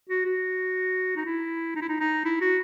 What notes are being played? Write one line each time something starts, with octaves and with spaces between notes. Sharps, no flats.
F#4
F#4
D#4
E4
D#4
E4
D#4
D#4
E4
F#4